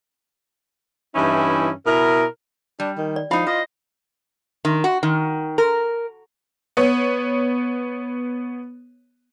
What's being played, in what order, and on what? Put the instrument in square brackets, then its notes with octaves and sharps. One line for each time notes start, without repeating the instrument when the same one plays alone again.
[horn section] G2 E3 C#4 D#4 E4
B2 E4 A#4
[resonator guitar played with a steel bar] G3 [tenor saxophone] D4
[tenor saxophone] D#3
[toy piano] D5
[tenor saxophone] F3 [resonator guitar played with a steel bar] D#4 F5 [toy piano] E4 B5
[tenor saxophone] F4 [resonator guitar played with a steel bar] C5 [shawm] D#5
[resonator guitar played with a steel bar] D#3
F#4
D#3
A#4
[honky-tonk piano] B3 C#5